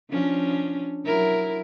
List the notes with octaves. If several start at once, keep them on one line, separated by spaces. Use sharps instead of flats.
F3 C#4 D4
F#3 E4 A#4